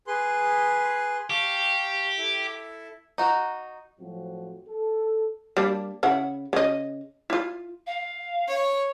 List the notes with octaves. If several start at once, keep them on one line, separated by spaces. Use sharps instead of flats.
G#4 B4 C6
G4 F5 A5 C#6
E4 A4 E5
D#4 F#4
A2 F3 F#3 C4 F#4
A4
G3 A#3 D4
C#3 E4 F#5
C#3 D#5
E4 F4
F5
C#5